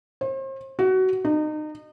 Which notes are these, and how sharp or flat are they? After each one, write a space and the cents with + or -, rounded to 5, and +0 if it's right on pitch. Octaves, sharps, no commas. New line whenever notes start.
C5 +40
F#4 +20
D#4 -30